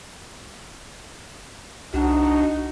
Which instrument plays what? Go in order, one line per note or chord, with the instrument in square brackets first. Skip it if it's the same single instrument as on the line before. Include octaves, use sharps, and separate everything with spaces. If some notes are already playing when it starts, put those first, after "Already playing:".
[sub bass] C2 [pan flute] D4 [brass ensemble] D#4 F#4